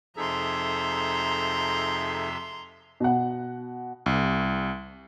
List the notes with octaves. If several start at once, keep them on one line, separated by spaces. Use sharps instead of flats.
F2 C3 D#4 G#4 A4 E5 A#5 C6
B2 F#5
C2